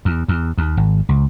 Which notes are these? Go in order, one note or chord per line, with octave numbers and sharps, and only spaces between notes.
E2
E2
D#2
G#1
C#2